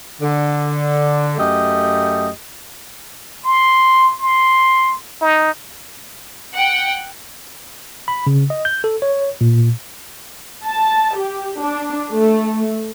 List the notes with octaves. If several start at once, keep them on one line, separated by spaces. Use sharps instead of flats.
D3
F#2 A3 G4 D#5
C6
C6
D#4
F#5 G5
B5
C#3
D#5
G6
A4
C#5
A#2
A5
G4
D4
A3